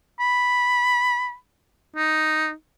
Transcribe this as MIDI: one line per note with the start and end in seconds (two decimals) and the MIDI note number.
0.20 1.35 83
1.96 2.52 63